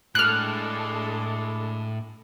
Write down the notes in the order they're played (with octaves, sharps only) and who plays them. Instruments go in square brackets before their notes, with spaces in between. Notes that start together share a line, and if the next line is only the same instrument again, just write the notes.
[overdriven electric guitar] A2 [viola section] G#3 D4 A4 [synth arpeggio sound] F6 F#6